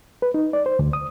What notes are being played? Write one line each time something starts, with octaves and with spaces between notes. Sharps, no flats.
B4
D#4
D5
C5
D2
D#6